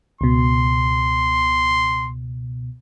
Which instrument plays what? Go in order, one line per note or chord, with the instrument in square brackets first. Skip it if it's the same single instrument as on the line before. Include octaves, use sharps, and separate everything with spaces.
[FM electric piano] C#2 B2 [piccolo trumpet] C6